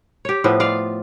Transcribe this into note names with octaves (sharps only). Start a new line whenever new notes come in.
G4 C#5
A2 F3 B3
F4 D5 F5